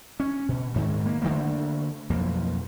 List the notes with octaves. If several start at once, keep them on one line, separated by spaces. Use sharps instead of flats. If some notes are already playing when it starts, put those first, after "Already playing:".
C#4
B2
D2 G#2 D#3
A#3
D3 F#3 A3 A#3
B1 F2 F3 A#3